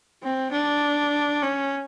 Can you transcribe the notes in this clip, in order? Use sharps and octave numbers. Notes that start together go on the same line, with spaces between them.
C4
D4
C#4